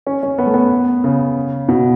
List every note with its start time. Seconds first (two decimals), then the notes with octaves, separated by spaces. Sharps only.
0.07 C#4
0.23 C#4
0.38 B3
0.46 A3
0.54 B3
1.04 C#3
1.68 B2